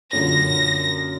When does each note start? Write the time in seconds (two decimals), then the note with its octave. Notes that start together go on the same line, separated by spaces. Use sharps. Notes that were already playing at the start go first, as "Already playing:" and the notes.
0.13 F#2 A#2 D3 A#6